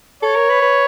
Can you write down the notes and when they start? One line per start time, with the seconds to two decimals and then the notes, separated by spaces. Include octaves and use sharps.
0.23 A4 C#5
0.36 A#4
0.49 B4
0.62 B4